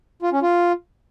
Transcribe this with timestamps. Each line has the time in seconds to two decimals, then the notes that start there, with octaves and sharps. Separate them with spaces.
0.22 F4
0.33 C#4
0.43 F4